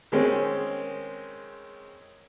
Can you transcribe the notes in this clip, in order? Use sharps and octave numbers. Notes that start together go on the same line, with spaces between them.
D#3 G#3 C4 C#4